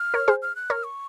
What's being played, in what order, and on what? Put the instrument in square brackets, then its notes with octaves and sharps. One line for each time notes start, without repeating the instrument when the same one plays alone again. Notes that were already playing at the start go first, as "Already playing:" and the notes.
Already playing: [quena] F6
[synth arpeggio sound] A#4 C#5
G#4 C5
[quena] F6
F#6
[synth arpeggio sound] A#4 C#5 [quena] F6
[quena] C#6